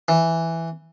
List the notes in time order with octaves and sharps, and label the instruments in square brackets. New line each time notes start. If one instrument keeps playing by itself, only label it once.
[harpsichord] E3